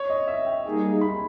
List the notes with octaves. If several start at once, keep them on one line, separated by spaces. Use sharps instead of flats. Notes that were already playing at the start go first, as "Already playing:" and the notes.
Already playing: C#5
D#5
E5
G5
G3 A#3 D#4 G#4
B5